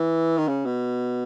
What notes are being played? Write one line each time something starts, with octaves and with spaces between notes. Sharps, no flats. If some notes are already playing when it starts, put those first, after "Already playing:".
Already playing: E3
D#3
C#3
B2